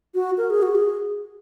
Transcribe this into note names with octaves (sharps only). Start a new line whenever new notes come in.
F#4
A#4
G#4
F#4
G#4